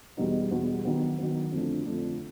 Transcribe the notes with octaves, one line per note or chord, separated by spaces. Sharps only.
E2 B2 G3 B3 D#4
E2 B2 G3 B3 D#4
D#3 F#3 B3
D#3 F#3 B3
F2 D3 F3 A3 D4
F2 D3 F3 A3 D4